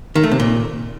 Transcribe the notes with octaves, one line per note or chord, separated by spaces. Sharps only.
D#3
A3
C3
A#2